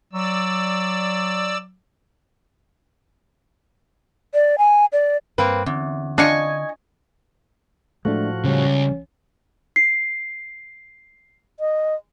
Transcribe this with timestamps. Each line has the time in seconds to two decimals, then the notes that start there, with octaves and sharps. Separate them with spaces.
0.13 F#3 D5 E6
4.34 D5
4.58 G#5
4.93 D5
5.38 G2 A#3 C4 B4
5.66 E2 D3 C4 C#4
6.18 D4 F4 D#5 G#5 C#6
8.05 A2 F3 G#3 A3 D4 F#4
8.44 C#2 C#3 G3 C#4
9.76 C7
11.60 D#5